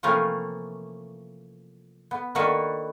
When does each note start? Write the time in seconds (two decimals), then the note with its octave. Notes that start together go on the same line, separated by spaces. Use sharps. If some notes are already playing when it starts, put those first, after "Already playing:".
0.03 C3 E3 F3 A3 A#3 C#4
2.11 B3
2.35 D#3 A#3 D4 F#4 A4 B4